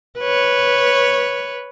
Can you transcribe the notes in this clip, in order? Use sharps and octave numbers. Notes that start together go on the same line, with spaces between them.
B4 C#5